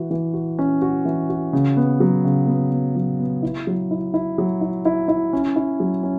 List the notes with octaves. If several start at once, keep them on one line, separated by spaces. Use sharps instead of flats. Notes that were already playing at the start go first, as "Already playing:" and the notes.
Already playing: E3 F#4
E3
F#4
C#4
F#4
E3
F#4
C#3
B3
F#3
C#3
B3
B3
F#3
B3
E4
F#3
E4
E4
F#3
E4
E4
E4
C#4
E4
F#3
C#4